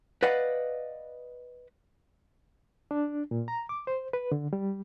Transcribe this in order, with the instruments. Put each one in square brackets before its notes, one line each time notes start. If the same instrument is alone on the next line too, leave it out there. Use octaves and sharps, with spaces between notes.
[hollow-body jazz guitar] B4 D5 D#5 F5 F#5
[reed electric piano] D4
A#2
A#5
D6
C5
B4
D3
G3